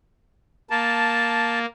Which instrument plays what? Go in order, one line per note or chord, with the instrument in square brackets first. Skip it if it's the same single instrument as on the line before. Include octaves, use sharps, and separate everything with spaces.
[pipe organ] A#3 [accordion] A5